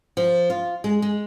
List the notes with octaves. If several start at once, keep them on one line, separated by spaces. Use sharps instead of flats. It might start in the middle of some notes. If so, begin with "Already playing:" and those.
F3
F4
G#3
G#3